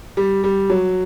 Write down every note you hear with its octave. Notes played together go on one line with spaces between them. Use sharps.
G3
G3
F#3